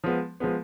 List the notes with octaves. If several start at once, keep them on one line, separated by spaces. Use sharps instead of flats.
F3 G#3 B3
F3 G#3 B3